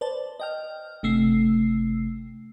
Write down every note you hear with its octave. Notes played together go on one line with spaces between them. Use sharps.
B4 C5 D5 A5
D#5 G5 F6
G1 C3 A3 E6 C7